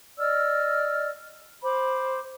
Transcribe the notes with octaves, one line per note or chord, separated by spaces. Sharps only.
D5 D#5 E6 F6
C5 B5 D6